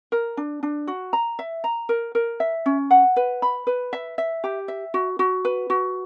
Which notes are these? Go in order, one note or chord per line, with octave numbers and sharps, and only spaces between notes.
A#4
D4
D4
F#4
A#5
E5
A#5
A#4
A#4
E5
C#4
F#5
B4
B5
B4
E5
E5
G4
E5
F#4
F#4
B4
F#4